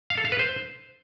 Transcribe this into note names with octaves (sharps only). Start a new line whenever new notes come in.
F5
A4
F5
B4
C5